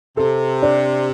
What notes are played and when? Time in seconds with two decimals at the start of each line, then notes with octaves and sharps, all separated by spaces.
0.17 C3 A4
0.62 D4